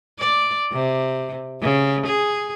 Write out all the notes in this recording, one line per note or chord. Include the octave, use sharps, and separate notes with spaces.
D5
C3
C#3
G#4